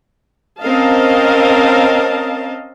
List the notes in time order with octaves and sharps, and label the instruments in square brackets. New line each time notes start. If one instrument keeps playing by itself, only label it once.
[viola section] C4 C#4 A#4 D#5 F5 A5